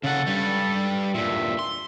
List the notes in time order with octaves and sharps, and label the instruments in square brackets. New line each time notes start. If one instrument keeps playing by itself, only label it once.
[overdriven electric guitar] C#3 F#5 [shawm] A4
[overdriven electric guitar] G2 G3
[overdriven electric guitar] G2 A#2 [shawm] E5
[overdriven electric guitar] C6